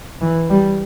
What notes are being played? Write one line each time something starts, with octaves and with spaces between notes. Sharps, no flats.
E3
G3